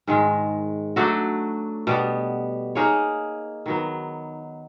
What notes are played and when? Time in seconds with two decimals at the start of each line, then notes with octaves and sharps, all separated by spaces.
0.07 G#2 D#3 G#3
0.96 F#3 A3 D4 F#4
1.87 B2 G3 B3
2.75 A#3 D#4 G#4 C#5
3.66 D#3 F#3 B3